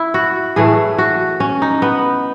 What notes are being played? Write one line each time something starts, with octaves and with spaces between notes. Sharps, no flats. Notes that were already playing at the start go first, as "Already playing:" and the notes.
Already playing: E4
F#4
A2 E3 A3 G#4
F#4
C#4
D#4
B3